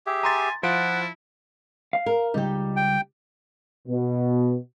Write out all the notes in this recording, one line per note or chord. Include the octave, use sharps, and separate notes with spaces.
G4 G#4 E5
G#5 A#5 C6 A6
F3 E4 F4 F#5 D7
F5
A#4
C#2 G3 D#4 G4
G5
B2